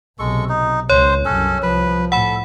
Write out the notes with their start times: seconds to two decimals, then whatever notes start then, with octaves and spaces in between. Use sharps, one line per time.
0.19 B1 C3 G#3 A4 C#6
0.49 D#4
0.90 C#2 C#3 C5 C#5
1.25 C2 F#2 C#4 A4
1.62 C2 F3 B4
2.12 A2 A4 F#5 B5